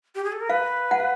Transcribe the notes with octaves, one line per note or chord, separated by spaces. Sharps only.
G4
G#4
A4
A#4
B4 F5
F#5
F5